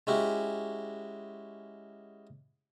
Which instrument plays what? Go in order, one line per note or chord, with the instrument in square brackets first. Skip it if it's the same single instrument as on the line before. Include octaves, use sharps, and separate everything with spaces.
[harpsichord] G#3 C#4 E4 F#4 G4